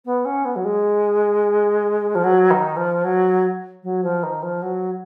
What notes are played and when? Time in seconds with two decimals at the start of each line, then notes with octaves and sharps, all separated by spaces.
0.05 B3
0.25 C#4
0.45 B3
0.55 F#3
0.64 G#3
2.15 F3
2.24 F#3
2.50 D#3
2.76 F3
3.04 F#3
3.83 F#3
4.03 F3
4.23 D#3
4.42 F3
4.62 F#3